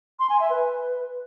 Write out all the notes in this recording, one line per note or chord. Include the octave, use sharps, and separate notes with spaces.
C6
G#5
E5
B4